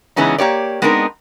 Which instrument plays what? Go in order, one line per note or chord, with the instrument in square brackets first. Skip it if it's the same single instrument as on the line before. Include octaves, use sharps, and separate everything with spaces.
[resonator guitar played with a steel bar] C#3 E3 G#3 B3 C#4 D#4
A#3 G4 C#5 D5
G#3 B3 C4 D4 D#4 A#4